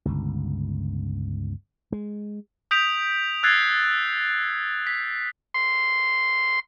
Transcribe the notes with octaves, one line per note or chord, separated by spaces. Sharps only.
G1 C#2
G#3
D#6 G6 B6 D7 F7
E6 F#6 G#6 A6 C7
B6
C6